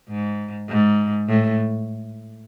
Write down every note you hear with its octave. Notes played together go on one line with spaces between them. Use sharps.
G#2
G#2
A2